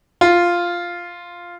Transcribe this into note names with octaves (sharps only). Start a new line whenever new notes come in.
F4